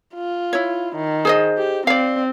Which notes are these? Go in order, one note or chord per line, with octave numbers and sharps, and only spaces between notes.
F4
E4 C#5
D#3
G#4 C5 D#5
G4
C4 D5 F5